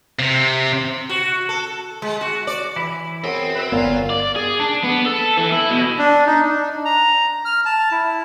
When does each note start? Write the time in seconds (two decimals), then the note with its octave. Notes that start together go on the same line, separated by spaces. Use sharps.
0.19 C3
1.09 F#4
1.49 A4
2.02 G#3
2.21 F#4
2.47 D5
2.76 E3 E4 B5
3.24 F#2 B3 C4 G#4 A4
3.56 B4 E6
3.72 G1 A#2 F#3 B3 F4 C#5
4.10 D5
4.36 G#4
4.59 D4
4.84 B3
5.06 A4
5.37 E3
5.52 E4
5.70 B2
5.99 D4
6.26 D#4
6.43 D4
6.85 A#5
7.45 F6
7.65 A5
7.92 E4